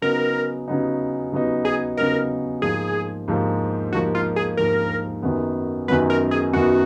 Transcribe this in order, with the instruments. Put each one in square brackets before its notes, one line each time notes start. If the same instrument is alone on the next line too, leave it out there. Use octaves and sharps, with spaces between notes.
[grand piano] C#3 F#3 B3 D#4 [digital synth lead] A#4
[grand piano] C#3 F#3 B3 D#4
C#3 F#3 B3 D#4
[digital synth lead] G#4
[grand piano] C#3 F#3 B3 D#4 [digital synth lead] A#4
[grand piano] G#2 F3 A#3 [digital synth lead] G#4
[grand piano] G#2 F3 A#3
[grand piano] G#2 F3 A#3 [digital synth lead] F#4
[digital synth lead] F4
G#4
[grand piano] G#2 F3 A#3 [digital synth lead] A#4
[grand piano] F#2 D#3 F#3 B3
[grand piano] F#2 D#3 F#3 B3 [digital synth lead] B4
[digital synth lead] A#4
G#4
[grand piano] F#2 D#3 F#3 B3 [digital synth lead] F#4